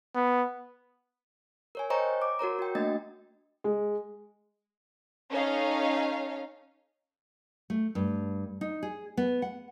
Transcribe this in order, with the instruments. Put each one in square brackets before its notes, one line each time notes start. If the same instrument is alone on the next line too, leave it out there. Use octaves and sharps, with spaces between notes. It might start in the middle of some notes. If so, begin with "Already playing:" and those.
[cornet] B3
[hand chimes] A#4 C#5 G#5
C5 C#5 D#5 G5 A#5 C#6
D6
F#4 A#4 C#5 A#5
F#4 G5
A3 A#3 D4 D#5 A6
[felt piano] G#3
[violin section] C#4 D#4 A4 C#5 F5
[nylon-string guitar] A3
G2
D#4
G#4
B3
F#5